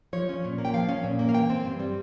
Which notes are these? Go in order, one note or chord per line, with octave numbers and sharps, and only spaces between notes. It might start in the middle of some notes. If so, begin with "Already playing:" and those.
F3 C#5
C#4
A#2
A#3
G5
F3 F5
C#4
A#2
A#3
F5
E3 G5
C4
G2
G3